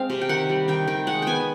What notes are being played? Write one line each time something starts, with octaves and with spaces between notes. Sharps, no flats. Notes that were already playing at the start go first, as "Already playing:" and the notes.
Already playing: G#3 C4 F5
C3
G5
D#3 F#5
G3
D#3 G5
D#3 G5
G#3 F#5
B3 G5 G#5